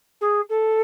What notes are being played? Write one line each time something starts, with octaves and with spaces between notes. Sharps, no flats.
G#4
A4